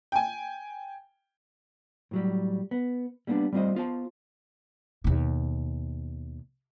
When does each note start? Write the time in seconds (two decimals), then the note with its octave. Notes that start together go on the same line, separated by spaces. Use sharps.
0.12 G5 G#5
2.11 A2 F#3 G3
2.71 B3
3.27 G3 A#3 B3 C#4 D4
3.53 G3 A3 C4 F4 C5 D#5
3.75 B3 F4 C5 A5
5.04 D#2 B2